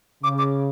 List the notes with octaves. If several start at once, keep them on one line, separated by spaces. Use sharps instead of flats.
C#3 D6
D6